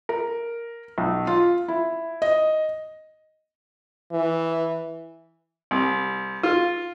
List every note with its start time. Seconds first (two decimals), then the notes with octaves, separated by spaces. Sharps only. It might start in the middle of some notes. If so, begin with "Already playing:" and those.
0.09 A#4
0.98 B1
1.27 F4
1.68 E4
2.22 D#5
4.12 E3
5.71 C2
6.43 F4